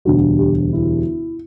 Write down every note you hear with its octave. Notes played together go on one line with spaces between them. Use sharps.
E1 D2 D3 G3 F#4
G4
E4